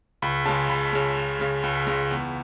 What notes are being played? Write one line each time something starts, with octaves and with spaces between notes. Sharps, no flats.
C#2 B5
C#3 G#3 A5
C#2 B5
C#3 G#3
C#2
C#3 G#3
C#2 B5
C#3 G#3
E2